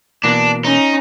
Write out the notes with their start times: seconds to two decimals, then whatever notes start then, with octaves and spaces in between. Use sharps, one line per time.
0.24 B2 E3 A#3 D4
0.65 C#4 D#4